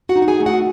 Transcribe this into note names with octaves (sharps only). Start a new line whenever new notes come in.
F#4 F#5
D#4
F#5
G#4 G#5
A3
F#4 F#5